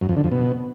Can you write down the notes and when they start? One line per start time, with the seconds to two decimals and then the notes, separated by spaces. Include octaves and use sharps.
0.01 F#2
0.09 F2
0.16 D3
0.24 F2
0.32 B2